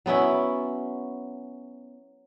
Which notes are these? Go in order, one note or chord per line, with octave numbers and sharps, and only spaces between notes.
F#3 B3 C#4 E4